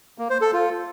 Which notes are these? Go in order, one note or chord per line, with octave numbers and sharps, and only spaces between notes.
A#3
C5
A4
F4